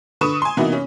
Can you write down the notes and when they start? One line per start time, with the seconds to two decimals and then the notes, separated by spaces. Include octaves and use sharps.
0.21 D3 B4 C#6 D#6 E7
0.42 G#5 C6
0.57 C3 E3 A#3 B3 D#4 F#4
0.72 C#4